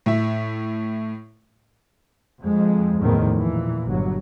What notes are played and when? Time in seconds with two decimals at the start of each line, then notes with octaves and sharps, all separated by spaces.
0.06 A2 E5
2.44 F2 G#3
3.01 F#1 E2 A2 D#3 F3
3.40 A#2 E3
3.86 G1 F#3